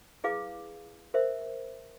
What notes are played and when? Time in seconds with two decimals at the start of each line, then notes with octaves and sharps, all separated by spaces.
0.24 E4 G#4 B4 F5 D6
1.14 A#4 C5 E5